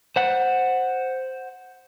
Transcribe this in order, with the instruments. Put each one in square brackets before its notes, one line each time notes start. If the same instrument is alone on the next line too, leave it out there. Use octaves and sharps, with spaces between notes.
[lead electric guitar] C5 F#5